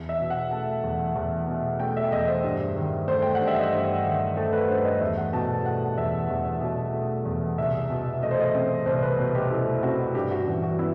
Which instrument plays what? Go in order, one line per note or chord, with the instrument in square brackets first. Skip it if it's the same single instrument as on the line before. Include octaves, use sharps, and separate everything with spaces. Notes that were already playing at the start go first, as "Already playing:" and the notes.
Already playing: [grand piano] E2
E5
B2
F#5
A3 A5
E2
E2
B2
A3 G5
E5
E2 D#5
C5
G2
D#3
A3 C5
G5
F#5
G2
E5
D#5
G2 C5
D#3
A3 A4
B4
G2 C5
D#5
E2 E5
F#5
B2 A5
A3 F#5
E2 E5
E2
B2
A3
E2
C2 E5
B2
A3 D#5
C5
D#5
C4
C2 C5
B4
B2
G4
A3 E4
C4 F#4
G2 G4
F#4
E3
F#4
B3 E4